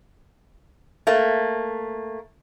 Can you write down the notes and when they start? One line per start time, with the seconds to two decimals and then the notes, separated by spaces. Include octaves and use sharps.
1.07 A3 A#3